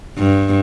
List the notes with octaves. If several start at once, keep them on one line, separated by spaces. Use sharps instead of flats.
G2